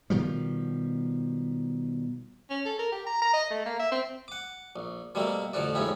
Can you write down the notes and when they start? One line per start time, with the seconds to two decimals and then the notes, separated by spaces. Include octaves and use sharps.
0.10 B2 D#3 F3 G3
2.50 C#4
2.65 A4
2.79 A#4
2.92 G4
3.06 A#5
3.22 A#5
3.33 D#5
3.50 A3
3.66 A#3
3.79 E5
3.91 C4
4.28 F#5 D6
4.76 A#1
5.15 B2 G3 A3 A#3 C4
5.53 A1 F2 D3 F3 F#4 D5
5.75 A#1 F2 G#2 C#4 E4 G4